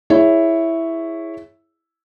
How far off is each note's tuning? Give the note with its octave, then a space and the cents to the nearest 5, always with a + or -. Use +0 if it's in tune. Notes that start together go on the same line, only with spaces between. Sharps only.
E4 +0 G#4 +0 C#5 +0